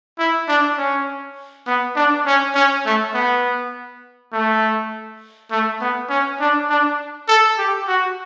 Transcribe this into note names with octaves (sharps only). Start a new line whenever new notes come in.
E4
D4
C#4
B3
D4
C#4
C#4
A3
B3
A3
A3
B3
C#4
D4
D4
A4
G4
F#4